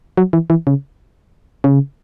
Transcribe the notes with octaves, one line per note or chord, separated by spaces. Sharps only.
F#3
E3
E3
C#3
C#3